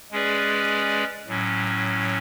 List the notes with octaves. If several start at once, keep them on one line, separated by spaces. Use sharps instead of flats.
G#3 C#4 G#4 B4 D5
A2 F#3 C#4